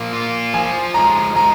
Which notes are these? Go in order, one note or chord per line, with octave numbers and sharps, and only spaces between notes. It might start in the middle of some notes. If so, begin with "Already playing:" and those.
Already playing: F3 A#3
F4
F3 G#5
G#3 A#5
G#3 A#5